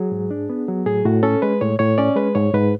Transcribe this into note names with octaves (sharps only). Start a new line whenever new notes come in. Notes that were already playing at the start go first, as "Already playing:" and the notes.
Already playing: F#3 G#4
G#2
D4
B3
F#3
A2 G#4
A2 F#4
C#4 A4
G#3 B4
A2 C#5
A2 C#5
C#4 D5
G#3 B4
G#2 C#5
G#2 B4